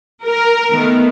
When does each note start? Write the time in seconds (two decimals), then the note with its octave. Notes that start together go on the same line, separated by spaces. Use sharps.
0.24 A#4
0.69 D#3 A3 B3